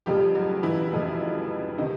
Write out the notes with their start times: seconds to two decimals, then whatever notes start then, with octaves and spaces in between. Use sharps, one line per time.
0.06 F1 F2 C#3 F3 G3 G4
0.35 F#3 F#4
0.63 E3 E4
0.92 F1 F2 C#3 F3
1.78 C3 D#3 D#4